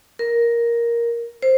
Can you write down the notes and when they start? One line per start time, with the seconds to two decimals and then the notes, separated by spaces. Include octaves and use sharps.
0.19 A#4
1.42 C5